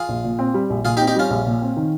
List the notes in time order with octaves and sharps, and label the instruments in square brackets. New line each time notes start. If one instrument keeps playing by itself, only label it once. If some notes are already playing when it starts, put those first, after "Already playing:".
Already playing: [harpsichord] F4 G#4
[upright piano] A#1
A#2
C4
G3
A#1
[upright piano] A#2 [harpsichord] F4 G#4
[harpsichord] D#4 G4
[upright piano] C4
[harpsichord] D#4 G4
[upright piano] G3 [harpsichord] C#4 F4
[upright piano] A#1
A#2
C4
D#3